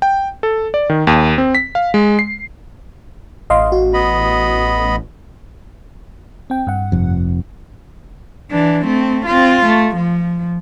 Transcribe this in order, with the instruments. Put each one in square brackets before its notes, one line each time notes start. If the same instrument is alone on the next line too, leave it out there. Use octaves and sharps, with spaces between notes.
[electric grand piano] G5
A4
D5
D#3
D#2
C4
B6
F5
G#3
C7
[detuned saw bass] A1 [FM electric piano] D#5 F5 C6
[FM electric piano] F#4
[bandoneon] B3 D#5 B5
[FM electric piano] C4 G5
G2 F#5
[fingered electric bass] F1 F2
[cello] E3 D4
A3 C4
C4 F4
A3
F3